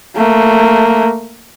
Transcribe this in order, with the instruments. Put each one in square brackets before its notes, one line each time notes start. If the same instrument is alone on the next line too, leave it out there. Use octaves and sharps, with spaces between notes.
[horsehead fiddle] A3 A#3